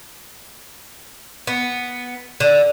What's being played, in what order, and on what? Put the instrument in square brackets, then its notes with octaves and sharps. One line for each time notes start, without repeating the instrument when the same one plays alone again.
[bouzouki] B3
D3